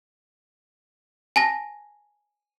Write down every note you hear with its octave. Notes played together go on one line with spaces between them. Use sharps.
G#5 A5 A#6